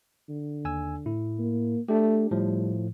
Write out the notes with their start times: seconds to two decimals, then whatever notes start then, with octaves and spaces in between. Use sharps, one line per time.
0.29 D3
0.65 D#2 G#5 E6
1.06 A2 E4
1.39 A#3
1.89 A3 D4 G4
2.31 A2 F3 G3